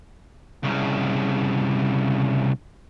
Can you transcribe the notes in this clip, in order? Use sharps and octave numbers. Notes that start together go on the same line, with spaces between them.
C2 C#3